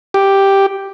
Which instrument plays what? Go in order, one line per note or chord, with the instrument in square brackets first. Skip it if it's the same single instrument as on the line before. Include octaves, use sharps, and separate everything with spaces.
[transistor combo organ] G4